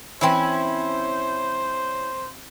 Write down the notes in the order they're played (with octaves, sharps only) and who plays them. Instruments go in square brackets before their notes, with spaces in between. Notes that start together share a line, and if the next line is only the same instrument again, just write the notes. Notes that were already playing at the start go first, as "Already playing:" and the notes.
[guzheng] E3 C4 [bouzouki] C#4 E4 [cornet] C5